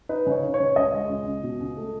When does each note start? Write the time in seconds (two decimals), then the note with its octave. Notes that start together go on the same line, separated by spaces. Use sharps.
0.09 D#4 B4
0.26 C#3 C#5
0.43 D#4
0.54 C#5
0.60 C#3
0.76 C#2 D#5
0.94 G#3
1.09 C#2
1.26 C#2
1.44 B2
1.60 C#2
1.77 A3